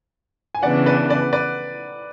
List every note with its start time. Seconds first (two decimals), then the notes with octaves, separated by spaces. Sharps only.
0.55 G#5
0.63 C#3 E3 B3 D4 D5 F#5
0.86 B4 D5
1.09 B4 D5
1.33 B4 D5